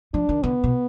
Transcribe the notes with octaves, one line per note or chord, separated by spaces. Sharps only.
F3 D4
D#3
D3 B3
B2